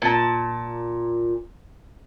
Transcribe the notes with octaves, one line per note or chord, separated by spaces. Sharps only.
A#2 A5